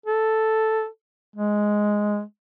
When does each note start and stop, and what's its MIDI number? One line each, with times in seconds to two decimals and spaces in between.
0.06 0.87 69
1.36 2.22 56